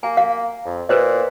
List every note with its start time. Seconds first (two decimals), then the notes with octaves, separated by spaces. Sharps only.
0.03 A#3 G#5
0.17 F5
0.66 F2
0.89 A#2 B4 C5 D#5